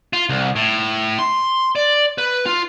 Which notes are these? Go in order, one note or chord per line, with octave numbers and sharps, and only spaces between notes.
F4
C2
A2
C6
D5
B4
F4